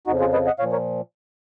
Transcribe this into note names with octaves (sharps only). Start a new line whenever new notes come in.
F2 C#3 F3 D#4 F#4
F4 G#4
B4 D#5
D#5 F#5
A#2 F3 C#5 F5
A#4 C#5